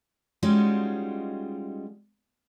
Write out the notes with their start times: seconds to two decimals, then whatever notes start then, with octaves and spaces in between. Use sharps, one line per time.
0.43 G3 G#3 C#4 D#4 F4 F#4